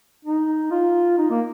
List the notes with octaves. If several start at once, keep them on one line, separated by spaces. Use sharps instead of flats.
D#4
F4
D#4
A#3